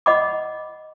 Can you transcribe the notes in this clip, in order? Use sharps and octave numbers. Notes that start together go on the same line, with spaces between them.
D#5 F#5 B5 D6